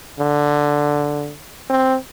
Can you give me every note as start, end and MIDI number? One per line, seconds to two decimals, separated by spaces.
0.20 1.33 50
1.70 1.97 60